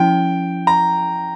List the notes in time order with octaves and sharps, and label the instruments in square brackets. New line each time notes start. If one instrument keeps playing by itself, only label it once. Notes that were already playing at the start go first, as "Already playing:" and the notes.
Already playing: [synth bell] F3 C#4 E4 [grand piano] G5
[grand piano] A#5